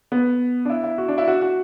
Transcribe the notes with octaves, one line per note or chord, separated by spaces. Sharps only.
B3
D4
E4
E4
F#4
D4
E4
F#4
F#4